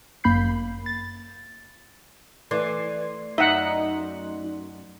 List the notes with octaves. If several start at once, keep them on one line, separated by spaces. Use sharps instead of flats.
G1 F#2 A#3 B5 G6 C7
A6
E3 A3 D5 C6
F#2 D#4 E5 F#5